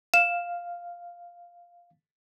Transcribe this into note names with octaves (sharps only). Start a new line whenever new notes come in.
F5 E7